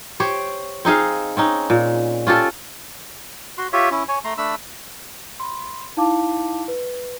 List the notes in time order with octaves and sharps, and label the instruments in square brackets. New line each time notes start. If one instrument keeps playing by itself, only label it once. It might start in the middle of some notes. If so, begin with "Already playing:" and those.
[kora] G4 C5 C#5
C4 D#4 G#4 F5
C4 C#4 D#4
A#2
C#4 F4 G4 A4
[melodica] F#4 C6
F4 G4 C#5 E5
C#4 E4
C#5 G#5
A3 A#5 C6
A3 D4 B5 E6
[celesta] B5 C6
D#4 E4 F5 A5 D6
B4